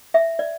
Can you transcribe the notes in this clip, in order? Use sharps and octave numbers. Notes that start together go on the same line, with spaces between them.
E5
D5